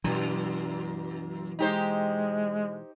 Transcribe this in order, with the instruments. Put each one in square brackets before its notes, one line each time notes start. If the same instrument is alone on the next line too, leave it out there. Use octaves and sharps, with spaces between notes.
[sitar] F#2 [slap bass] B2 E3
[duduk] G#3 [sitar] D#4 G4 C5